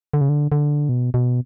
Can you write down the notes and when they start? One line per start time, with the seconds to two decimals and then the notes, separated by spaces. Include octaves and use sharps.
0.14 D3
0.21 C#3
0.29 D3
0.52 D3
0.89 B2
1.14 B2